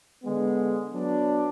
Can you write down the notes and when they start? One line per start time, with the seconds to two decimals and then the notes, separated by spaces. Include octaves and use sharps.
0.21 D3 G#3 B3
0.91 F#3 B3 D4